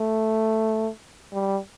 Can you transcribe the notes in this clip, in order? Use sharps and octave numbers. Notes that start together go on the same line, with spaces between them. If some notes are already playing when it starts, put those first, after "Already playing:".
Already playing: A3
G3